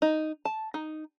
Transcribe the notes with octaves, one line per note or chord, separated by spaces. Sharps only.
D#4
A5
D#4